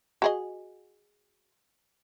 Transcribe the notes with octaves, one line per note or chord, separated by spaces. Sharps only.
F#4 G#4 D#5